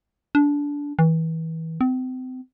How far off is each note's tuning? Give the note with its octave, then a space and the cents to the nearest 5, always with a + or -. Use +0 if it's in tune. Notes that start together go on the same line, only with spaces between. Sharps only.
D4 -20
E3 -30
C4 -35